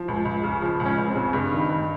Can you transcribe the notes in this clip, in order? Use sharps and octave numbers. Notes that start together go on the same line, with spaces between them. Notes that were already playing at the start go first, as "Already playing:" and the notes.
Already playing: F3
C#2
C#2
C#3
F3
C#2
C#4
C#2
C4
C#3
G2
D#3
G2